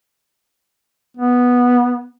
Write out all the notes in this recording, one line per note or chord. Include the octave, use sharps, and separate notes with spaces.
B3